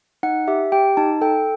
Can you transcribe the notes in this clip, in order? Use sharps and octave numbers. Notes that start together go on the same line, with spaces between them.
D#4 F#5
G4 E5
G4 G5
D#4 A5
A4 G5